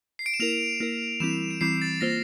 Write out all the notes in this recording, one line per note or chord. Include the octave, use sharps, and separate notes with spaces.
C7
D7
E7
A#3 E4 A#4 F7
A#3 E4 A#4
E3 G3 C4 E4 E7
D7
E3 G3 C4 E4 C7
A6
A#3 F4 C5 A#6